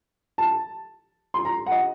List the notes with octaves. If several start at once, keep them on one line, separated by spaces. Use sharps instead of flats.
A5
C6
A#5
F#5
D#5